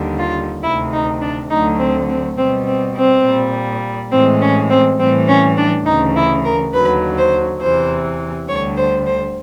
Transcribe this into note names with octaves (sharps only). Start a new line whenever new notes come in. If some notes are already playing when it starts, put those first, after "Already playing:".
Already playing: D#2 D3 G3
F4
D2 C3 D#3 E4
D#4
D4
D2 D3 F#3 A3 D#4
C4
C4
B2 G3 C4
C4
C4
A#2 G3
A2 E3 G#3 C4
C#4
C4
A2 E3 G3 C4
C#4
D4
D2 C#3 E3 D#4
E4
A#4
D#2 D3 F#3 B4
C5
E2 C3 E3 C5
D2 D3 G3 C#5
C5
C5